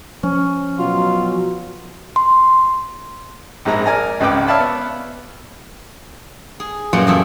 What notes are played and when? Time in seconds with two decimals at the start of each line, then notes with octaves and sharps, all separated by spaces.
0.23 F3 C#4
0.78 B2 F#3 F4
2.16 C6
3.65 A#1 G#2 G#3 A#5
3.86 A#4 D5 G#5 A#5
4.20 G#1 C#2 C#3 B4 G5 D6
4.48 C#5 D5 E5 F5 A5 B5
4.60 B3
6.60 G#4
6.93 F#2 A#2 F#3 G3 F4 F#5
7.07 E2 G#4 A4 E5